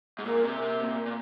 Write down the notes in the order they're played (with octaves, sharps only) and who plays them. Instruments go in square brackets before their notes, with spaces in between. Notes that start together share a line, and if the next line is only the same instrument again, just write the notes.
[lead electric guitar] G#2
[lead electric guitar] A#2 [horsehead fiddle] A#4
[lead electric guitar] C3
C3
A#2
A#2